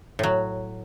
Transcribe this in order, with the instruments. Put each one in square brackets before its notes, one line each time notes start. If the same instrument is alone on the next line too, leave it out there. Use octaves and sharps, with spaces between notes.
[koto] A2 F#3